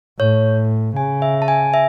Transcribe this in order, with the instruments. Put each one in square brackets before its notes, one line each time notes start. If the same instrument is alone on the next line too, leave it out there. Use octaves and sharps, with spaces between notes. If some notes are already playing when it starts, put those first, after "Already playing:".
[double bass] A2 [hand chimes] C#5
[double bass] C#3 [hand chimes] G#5
[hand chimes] E5
A5
G#5
E5